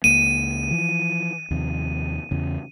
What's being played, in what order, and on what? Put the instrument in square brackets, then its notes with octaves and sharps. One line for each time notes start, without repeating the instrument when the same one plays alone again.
[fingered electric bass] C#2 A#3 [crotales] D#7
[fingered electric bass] E3 F3
D#2 C3 F3
E2 C#3